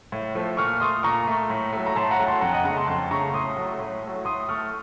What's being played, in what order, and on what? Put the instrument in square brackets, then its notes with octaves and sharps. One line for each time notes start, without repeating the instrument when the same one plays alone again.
[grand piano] A2
F3 A3
A#2 C#6 F6
A3 C6 D#6
A#2 A#5 C#6
A3
A2
F#3 A3
A#5
A2 A5 C6
F#5 A#5
F#3 A3
A5 C6
F2 F#5 A#5
D#5 F#5
C#3 A3 F#5 A#5
A5 C6
F2 A5 C6
C#3 A3 A#5 C#6
A2 C6 D#6
F#3 A3
A2
F#3 A3
A2 C6 D#6
A3 C#6 F6